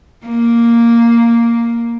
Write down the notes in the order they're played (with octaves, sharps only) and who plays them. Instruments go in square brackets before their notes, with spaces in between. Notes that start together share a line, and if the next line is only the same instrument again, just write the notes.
[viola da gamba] A#3